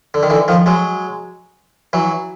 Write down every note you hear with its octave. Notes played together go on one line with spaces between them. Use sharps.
D3
D#3
D3 E3
D#3 F3
F#3 G#3
E3 F#3